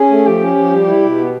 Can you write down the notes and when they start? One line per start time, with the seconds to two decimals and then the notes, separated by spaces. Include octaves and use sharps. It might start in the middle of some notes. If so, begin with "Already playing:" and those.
Already playing: C#4 G#4
0.10 A3
0.25 F3 G4
0.40 C#4
0.56 F3
0.72 G3
0.87 E4
1.02 B2
1.17 B3